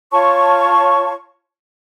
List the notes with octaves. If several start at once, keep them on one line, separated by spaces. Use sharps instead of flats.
F4 C#5 A5 C#6